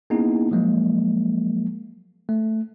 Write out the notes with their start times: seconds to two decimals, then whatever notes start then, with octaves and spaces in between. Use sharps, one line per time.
0.10 A#3 B3 C#4 D#4 E4 G#4
0.51 F3 F#3 G#3 A#3
2.29 A3